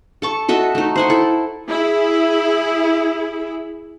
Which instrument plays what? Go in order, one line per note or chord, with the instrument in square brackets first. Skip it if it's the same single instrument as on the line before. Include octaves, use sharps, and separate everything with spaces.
[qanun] A4 A5 C#6
F#4 A4 D#5 E5
A3 D#4
C5 F#5 G#5
E4 A4
[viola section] E4 G#4